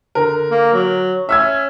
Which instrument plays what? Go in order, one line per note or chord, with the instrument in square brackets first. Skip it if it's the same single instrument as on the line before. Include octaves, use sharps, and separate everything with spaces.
[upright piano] D3 A#4
[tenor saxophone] A#3
F#3
[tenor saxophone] C#4 [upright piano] E5 E6 G#6